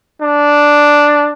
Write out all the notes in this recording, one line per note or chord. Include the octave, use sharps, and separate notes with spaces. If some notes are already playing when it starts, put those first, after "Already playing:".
D4